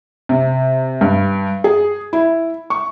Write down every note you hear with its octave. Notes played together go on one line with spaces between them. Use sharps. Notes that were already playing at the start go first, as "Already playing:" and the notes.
C3
G2
G#4
E4
C#6